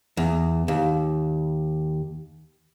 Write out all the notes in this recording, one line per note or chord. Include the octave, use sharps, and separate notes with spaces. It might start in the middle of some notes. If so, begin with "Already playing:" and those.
E2
D#2